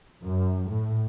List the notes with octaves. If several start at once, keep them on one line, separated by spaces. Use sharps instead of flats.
F#2
A2